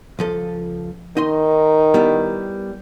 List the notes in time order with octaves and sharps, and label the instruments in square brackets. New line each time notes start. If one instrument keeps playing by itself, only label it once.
[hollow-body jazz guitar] C#2 F3 A4
[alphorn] D#3 [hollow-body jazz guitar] D#4 D#5 C6
[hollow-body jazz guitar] G3 B3 E4